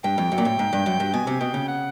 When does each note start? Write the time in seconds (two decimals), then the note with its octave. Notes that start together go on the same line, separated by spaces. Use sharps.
0.04 G2 G5
0.18 F2
0.32 F#2
0.38 A#2
0.45 A2
0.59 G#2
0.73 G2
0.86 F#2
1.00 G2
1.13 B2 G#5
1.27 C3
1.40 B2 G5
1.54 C#3
1.68 F#5